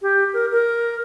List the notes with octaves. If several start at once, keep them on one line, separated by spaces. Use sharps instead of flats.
G4
A#4
A#4